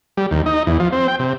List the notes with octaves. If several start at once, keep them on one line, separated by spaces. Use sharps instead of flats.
G3
D#2
D#4
E2
F3
C4
G5
C3